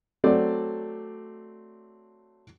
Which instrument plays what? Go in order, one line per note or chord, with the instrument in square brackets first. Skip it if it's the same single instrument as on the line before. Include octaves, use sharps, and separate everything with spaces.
[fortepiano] F#3 A3 C4 A4 D5